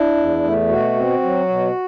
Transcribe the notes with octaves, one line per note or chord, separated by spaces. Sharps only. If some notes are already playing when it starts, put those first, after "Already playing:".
Already playing: D4 E4
E2
A3
B2 F#4
C4
F#3
B2